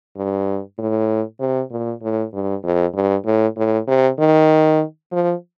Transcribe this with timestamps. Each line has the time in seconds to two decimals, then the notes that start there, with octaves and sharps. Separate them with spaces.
0.17 G2
0.78 A2
1.40 C3
1.71 A#2
2.02 A2
2.34 G2
2.64 F2
2.95 G2
3.26 A2
3.57 A2
3.88 C3
4.19 D#3
5.12 F3